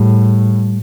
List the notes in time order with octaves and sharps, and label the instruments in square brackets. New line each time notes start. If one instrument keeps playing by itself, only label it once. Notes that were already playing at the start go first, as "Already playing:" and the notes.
Already playing: [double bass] A2 [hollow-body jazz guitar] G3